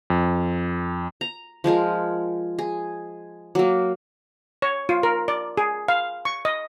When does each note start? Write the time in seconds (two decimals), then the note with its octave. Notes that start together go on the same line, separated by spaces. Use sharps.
0.10 F2
1.21 A#5
1.64 F3 G#3 G#4 A#4
2.59 G#4
3.55 F#3 A#3
4.62 C#5
4.89 F4
5.03 A#4
5.28 D5
5.57 G#4
5.88 F5
6.25 C#6
6.45 D#5